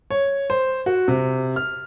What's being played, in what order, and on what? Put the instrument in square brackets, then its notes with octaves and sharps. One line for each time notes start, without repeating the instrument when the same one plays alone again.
[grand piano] C#5
C5
F#4
C3
F6